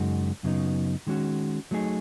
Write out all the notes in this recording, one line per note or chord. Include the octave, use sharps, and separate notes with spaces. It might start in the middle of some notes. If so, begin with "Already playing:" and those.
Already playing: F#2 C#3 G#3 D#4 F#4
F#2 C#3 F#3 B3 D#4
D#3 G#3 C#4 F#4
F#3 A3 D#4 G#4